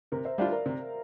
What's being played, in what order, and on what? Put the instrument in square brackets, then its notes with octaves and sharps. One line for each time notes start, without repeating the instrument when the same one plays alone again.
[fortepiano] C3 [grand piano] A#4
[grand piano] C5 E5
[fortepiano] G3 D4 F4 [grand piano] D5 F5
[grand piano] A#4 D5
[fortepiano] C3